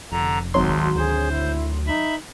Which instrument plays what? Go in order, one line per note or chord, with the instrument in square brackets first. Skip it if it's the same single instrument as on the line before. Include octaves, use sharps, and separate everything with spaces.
[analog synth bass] F1 [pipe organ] D3 A#5
[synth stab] G#1 F#3 C6 [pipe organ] D2
[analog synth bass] D2 [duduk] G#4 [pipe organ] C5
[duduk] E4
[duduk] D#4 [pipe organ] E5 B5